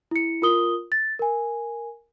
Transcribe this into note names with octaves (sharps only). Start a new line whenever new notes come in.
E4 C#7
F4 A#4 D#6 G7
A6
A#4 G#5